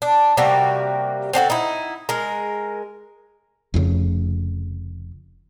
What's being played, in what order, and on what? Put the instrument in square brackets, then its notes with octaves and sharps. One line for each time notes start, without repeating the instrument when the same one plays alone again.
[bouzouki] D4
C3 G3 A#3 F#4
C4 D4 F#4 A4
D#4 E4
G#3 A#4
[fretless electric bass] F1 F2 G#2 C#3